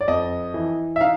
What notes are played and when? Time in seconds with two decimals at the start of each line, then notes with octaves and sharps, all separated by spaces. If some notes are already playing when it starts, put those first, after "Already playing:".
0.01 D5
0.08 F2 D#5
0.54 E3
0.96 E5
1.01 D#4 F5